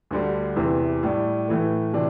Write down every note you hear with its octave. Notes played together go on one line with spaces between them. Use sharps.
D2 D3 G3
E2 C3 E3
A2 G3 D4
A2 E3 A3
C3 E3 D4